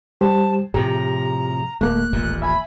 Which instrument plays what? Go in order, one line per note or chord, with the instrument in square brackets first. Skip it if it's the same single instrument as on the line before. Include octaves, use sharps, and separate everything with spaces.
[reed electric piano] G3 G4 C5 [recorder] A5
[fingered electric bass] A2 C3 F3 [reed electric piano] G4 G#4 [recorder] A#5
[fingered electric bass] D1 [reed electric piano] A3 A#3 [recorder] F#6
[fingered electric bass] D#1 A1 A#2
[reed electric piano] E5 G#5 [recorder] B5